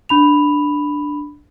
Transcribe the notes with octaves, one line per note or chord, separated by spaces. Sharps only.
D4 B5 F7